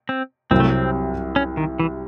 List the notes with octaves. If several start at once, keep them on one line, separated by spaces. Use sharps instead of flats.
C4
C2 C3 F#3 C4
A3
C4
C#4
D#3
E3